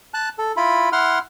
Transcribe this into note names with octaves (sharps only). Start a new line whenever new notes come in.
A5 F#6
A4
E4 F4 B5
E4 F#5 C6 F6